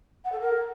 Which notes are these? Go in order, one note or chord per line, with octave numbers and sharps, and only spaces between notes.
F#5
A4
A#4